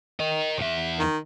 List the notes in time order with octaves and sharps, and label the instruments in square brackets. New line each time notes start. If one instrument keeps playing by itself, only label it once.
[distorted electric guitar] A#4 D#5
E2 E5
[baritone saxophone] D#3